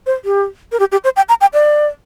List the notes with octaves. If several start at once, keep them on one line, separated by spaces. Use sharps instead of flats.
C5
G4
A#4
G4
G4
C5
G5
A#5
G5
D5